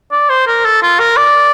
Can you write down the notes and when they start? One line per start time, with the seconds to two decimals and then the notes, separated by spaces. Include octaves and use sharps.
0.11 D5
0.29 C5
0.47 A#4
0.65 A4
0.82 F4
0.99 A#4
1.17 D5